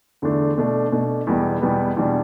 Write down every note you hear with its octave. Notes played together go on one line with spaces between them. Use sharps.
E2 D3 A3 D4
B2 A3 D4
B2 A3 D4
E2 B2 G3 B3
E2 B2 G3 B3
E2 B2 G3 D4